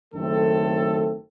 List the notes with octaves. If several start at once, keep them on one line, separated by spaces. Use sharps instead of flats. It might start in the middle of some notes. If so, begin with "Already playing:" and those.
F#1 F#2 D#3 A3 C4 A4